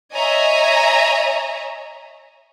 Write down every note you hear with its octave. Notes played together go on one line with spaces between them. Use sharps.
C#5 D#5 E5 G#5 A#5